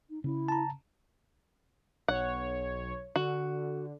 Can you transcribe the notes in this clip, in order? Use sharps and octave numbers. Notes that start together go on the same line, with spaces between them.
D#4
C#3 C4 C#4 E4
A5 A#5
B1 C#5 F#5
D3 F#4